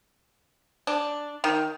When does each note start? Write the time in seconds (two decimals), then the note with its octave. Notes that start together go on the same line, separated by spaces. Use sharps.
0.87 D4
1.44 D#3